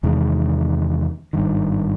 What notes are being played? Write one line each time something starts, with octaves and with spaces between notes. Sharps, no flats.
E2 C3 D#3 G#3
G#1 G2 D#3